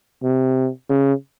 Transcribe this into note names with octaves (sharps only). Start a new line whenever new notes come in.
C3
C#3